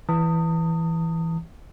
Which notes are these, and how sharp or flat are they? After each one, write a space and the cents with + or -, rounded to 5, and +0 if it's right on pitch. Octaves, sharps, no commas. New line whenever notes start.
E3 +0 A5 +45 D#6 +0